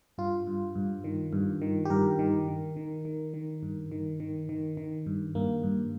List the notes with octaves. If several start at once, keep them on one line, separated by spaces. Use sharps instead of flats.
G2 F4
G2
G2
D#3
G2
D#3
G4
G2 A#4
D#3
D#3
D#3
D#3
D#3
G2
D#3
D#3
D#3
D#3
G2
G2 A#3
G2